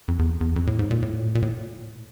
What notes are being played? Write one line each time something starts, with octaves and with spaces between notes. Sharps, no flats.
F2
E2
E2
F2
A2
G#2
A#2
A2
A#2
A2